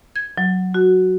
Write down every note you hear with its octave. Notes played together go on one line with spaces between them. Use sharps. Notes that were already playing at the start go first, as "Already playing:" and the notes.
G#6
F#3
F#4